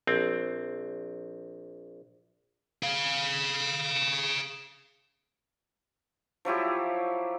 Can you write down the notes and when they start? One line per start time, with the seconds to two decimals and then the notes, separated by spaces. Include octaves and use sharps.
0.07 A#1 C4
2.83 G#4 F5
6.45 F3 F#3 E4 G4